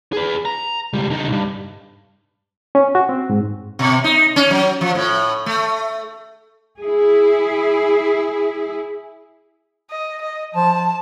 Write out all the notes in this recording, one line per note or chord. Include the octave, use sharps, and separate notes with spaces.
G#4 B4
A#5
C#2 G3
D3 D#4
B1 G2
C#4
F#4
C4
G#2
B2
D#4
C#4
F#3
F3
A2
A3
E4 G#4
D#5
D#5
F3 A5